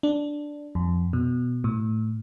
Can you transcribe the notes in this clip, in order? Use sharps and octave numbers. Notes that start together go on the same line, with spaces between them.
D4
F2
B2
A2